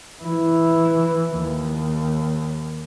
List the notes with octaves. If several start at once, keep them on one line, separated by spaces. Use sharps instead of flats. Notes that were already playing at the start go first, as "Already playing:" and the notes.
E3 E4
D#2